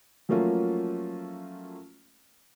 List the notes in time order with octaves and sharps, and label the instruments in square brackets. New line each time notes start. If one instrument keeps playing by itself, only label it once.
[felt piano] F3 F#3 A3 A#3 C#4 F4